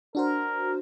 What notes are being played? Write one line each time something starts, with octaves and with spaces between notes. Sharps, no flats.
D4 F#4 A#4 C5